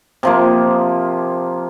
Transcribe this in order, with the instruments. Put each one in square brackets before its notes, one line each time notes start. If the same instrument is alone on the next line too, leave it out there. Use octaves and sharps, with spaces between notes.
[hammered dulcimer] C3 F3 A#3